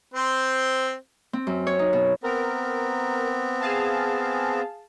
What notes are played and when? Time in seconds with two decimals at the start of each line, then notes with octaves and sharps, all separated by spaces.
0.14 C4 C5
1.33 C4
1.47 F#2
1.67 C#5
1.79 D#4
1.93 B2
2.23 B3 C4 A#4
3.60 G#4 F5 A5